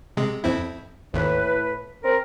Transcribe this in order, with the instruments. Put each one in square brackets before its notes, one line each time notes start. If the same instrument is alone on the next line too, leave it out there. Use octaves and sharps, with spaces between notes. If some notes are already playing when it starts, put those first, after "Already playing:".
[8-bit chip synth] C3 G#3
F2 C4 E4
[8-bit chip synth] G#1 D#2 [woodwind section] A2 B4
[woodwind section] C4 A#4